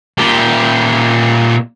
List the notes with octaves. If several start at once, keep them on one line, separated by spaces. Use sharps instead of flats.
A#2 G4